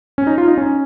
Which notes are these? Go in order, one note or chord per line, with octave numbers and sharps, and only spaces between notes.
C#4
D#4
F4
D#4
C#4